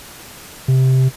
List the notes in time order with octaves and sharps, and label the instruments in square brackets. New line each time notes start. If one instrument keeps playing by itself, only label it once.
[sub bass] C3